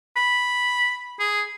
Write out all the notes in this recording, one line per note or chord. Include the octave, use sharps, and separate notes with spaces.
B5
G#4